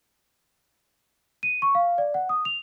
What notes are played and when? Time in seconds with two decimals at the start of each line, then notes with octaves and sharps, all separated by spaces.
1.43 D#7
1.62 C#6
1.75 F5
1.98 D5
2.14 F#5
2.29 D#6
2.45 F7